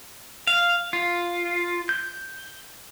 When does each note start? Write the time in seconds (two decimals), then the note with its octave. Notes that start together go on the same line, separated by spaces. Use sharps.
0.47 F5
0.93 F4
1.89 G6